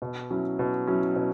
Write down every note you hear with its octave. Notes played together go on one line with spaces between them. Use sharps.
B2
F#3 C#4 E4
B2
F#3 C#4 E4
B2